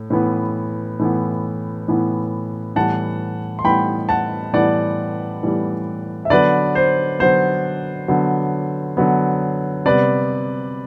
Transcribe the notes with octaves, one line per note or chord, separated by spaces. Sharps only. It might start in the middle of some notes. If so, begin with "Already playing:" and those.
Already playing: A2
A2 E3 B3
A2 E3 B3
A2 E3 B3
A2 E3 G3 B3 F#5 A5
C6
A2 E3 G3 B3 G5 B5
F#5 A5
A2 E3 G3 B3 D5 F#5
A2 E3 G3 B3
E5
D3 F#3 B3 B4 D5
C5
D3 F#3 B3 C5
D3 F#3 B3
D3 F#3 B3
C3 G3 B3 B4 D5